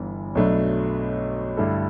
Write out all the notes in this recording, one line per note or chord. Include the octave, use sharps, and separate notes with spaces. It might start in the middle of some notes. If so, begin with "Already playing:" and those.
Already playing: G1 G2 E3 B3
B1 B2 F#3 A3 D4
G2 D3 A3 E4 A4